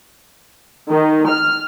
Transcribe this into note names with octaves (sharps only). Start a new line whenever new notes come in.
D#3
F6